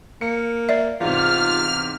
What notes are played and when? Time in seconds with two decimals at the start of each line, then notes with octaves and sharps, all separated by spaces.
0.21 A#3 C#7
0.69 D5 E5
1.00 E2 G#2 C3 F4 F6